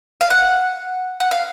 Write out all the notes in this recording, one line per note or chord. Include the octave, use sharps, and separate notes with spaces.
F5
F#5
F#5
F5